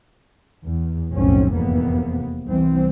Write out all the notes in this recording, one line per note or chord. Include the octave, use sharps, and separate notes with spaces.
E2
F1 B1 A2 C4 C#4
F1 E2 G#2 C3 A#3 B3
C2 E3 C4